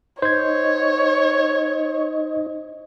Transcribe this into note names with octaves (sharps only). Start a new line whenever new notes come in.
D#4 C5 C#5 D#5 G#6